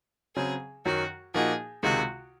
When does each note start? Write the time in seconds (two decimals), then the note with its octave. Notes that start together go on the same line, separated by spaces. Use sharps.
0.36 C#3 F#3 C4 G#4
0.85 F#2 D#3 F#3 F#4
1.34 A#2 F3 A#3 D#4 F#4 G#4
1.83 C#2 C3 D#3 G#3 F#4